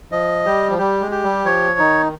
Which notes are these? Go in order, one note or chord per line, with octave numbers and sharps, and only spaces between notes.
F3 D#5
G3 G4
F3
G3 G4
G#3
G4
G3
F3 C#5
D#3 D#4